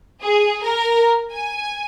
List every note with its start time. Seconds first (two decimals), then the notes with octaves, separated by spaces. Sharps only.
0.21 G#4
0.63 A#4
1.30 G#5